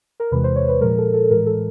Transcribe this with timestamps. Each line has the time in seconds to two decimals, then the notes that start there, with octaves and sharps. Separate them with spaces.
0.20 A#4
0.31 E2 C3 E3 G#3 B4
0.44 C5
0.56 C#5
0.69 B4
0.81 A#2 F3 G#3 A#4
0.98 A4
1.14 A4
1.30 A2 E3 G#3 A#4
1.46 A4